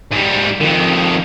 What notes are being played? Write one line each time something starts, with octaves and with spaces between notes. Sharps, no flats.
G#2 G3
F2 D#3